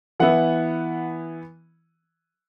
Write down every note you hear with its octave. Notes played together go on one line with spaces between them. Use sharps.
E3 B3 E4 F#5